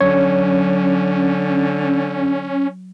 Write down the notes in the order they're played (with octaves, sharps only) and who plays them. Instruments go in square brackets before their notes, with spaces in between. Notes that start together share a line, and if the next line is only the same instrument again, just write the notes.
[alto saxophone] D3 [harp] F#3 [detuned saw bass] C#4 [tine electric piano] C#5